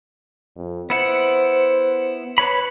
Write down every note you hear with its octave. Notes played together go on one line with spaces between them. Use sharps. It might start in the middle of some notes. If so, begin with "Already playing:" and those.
F2
B3 E4 C5 F#5
B4 C#5 B5